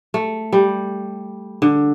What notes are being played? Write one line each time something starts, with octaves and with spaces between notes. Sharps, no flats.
A3
G3
D3